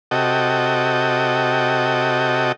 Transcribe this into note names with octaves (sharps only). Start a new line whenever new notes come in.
C3 F#4 A4 D#5 G5